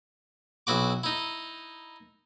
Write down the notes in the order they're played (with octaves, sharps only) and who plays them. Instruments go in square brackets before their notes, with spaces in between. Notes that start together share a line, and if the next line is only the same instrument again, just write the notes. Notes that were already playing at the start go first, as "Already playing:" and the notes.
[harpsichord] B1 E4 F#4 D6
D#4 E4